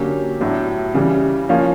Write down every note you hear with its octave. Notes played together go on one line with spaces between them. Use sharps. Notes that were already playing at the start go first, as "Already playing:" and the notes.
Already playing: D3 F#3 A#3 C#4 G4
A2 F#3 B3 D4
C#3 E3 G3
F3 A#3 C#4